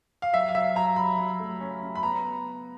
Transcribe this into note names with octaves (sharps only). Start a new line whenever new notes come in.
F5
F#3 E5
F5
F#3 E5
F#3 A#5
F#3 B5
F#3
A3
C#4
C#4
B5
B3 A#5